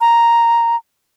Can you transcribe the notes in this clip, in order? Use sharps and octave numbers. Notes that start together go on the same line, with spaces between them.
A#5